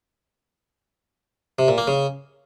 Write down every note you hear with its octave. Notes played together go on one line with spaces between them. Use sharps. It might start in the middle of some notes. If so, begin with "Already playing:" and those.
C3
A#2
A#3
C#3